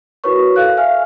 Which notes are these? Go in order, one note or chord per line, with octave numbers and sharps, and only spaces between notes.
E4 F#4 A#4 B4 C#5 C#6
A4 F5 F#6
E5 F5 G#5 F6